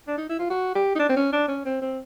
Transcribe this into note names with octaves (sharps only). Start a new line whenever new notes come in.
D4
D#4
E4
F4
F#4
G4
D#4
D4
C4
C#4
D4
C#4
C4
C4